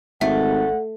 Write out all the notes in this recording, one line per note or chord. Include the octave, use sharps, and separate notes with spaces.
G#1 A3 E5 F#5